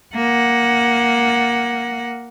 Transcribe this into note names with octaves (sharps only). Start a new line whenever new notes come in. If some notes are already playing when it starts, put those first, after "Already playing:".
A#3 F#5